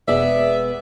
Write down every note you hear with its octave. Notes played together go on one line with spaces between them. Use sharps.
E1 B3 G#4 D5 E5